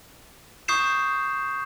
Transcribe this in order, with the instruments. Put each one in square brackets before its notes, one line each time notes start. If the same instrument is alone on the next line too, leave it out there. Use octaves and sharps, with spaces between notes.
[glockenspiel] C#6 D#6 G6 C7 E7